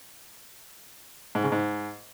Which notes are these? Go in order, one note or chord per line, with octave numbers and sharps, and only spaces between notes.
G#2
C#3
G#2